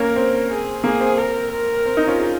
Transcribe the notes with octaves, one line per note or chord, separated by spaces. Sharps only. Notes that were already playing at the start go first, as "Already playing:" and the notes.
Already playing: A#3 C#4 A#4
C4
G#4
A#3 G#4
C4
A#4
A#4
C4
C4 D#4
C#4 F4
F4 G#4